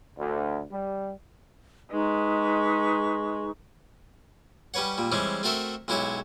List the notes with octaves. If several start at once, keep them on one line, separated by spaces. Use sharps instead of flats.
D2
G3
G#3 D#4 B4 C#6
G3 C#4 B4 C#5 F#5
A#2 G3
E3 G3 G#3 C4 C#4
A3 C4 F#4 A4 A#4 E5
B1 G#3 E4 F#4 G4 C#5